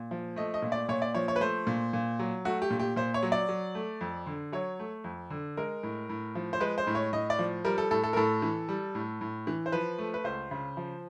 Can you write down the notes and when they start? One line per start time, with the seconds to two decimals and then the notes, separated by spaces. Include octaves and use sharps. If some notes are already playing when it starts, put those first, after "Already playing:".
Already playing: A#2
0.11 F3
0.36 A3 D#5
0.54 D#5
0.62 A#2
0.72 D5
0.89 A#2 C#5
1.02 D5
1.14 F3 C#5
1.28 C#5
1.36 B4
1.40 A3 C5
1.67 A#2
1.93 A#2
2.19 F#3
2.45 A3 F#4
2.62 G4
2.70 A#2
2.79 G4
2.96 A#2 C5
3.14 C#5
3.23 F#3
3.32 D5
3.49 F#3
3.75 A3
4.01 F2
4.26 D3
4.52 F#3 C#5
4.79 A3
5.04 F2
5.30 D3
5.57 G#3 A#4
5.83 A2
6.09 A2
6.35 F3
6.53 C5
6.60 G#3 B4
6.78 C5
6.87 A2
6.95 C#5
7.13 A2 D#5
7.30 D5
7.39 F3
7.65 G3 A#4
7.78 A4
7.91 A2 A4
8.04 A4
8.13 A#4
8.16 A2 A4
8.42 E3
8.69 G3
8.95 A2
9.21 A2
9.47 E3
9.66 C5
9.72 F3 B4
9.98 A3
10.14 B4
10.24 C#2 C5
10.51 C#3
10.77 F3